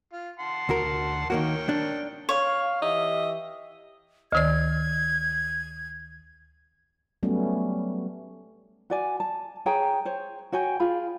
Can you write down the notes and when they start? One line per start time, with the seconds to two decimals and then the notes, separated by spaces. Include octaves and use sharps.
0.13 F4
0.39 F#5 A5 C6
0.69 D2 F#4 A#4
1.30 D#3 A#3 F#4 A#4 C#5 G5
1.69 D4
2.29 C#5 F5
2.82 E3 G4 D#5 E5
4.32 D2 D#3 D5 G#6
7.23 F#3 G3 A3 B3 C#4
8.90 F#4 D5 G#5
9.20 A5
9.66 G#4 C#5 G5 A#5
10.05 C5 C#5
10.52 F#4 C#5 G5 G#5
10.80 F4 G#4 B5